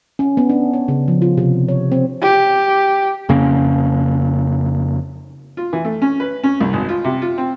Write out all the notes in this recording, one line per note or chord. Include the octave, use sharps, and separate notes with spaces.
C#4
B3
D4
C#5
C#3
F3
F4
C3
C#5
C4
G4
F2 C#3 A#3 C#4
F4
E3
A3
C#4
B4
C#4
C2
G#1
F4
C3
F4
C4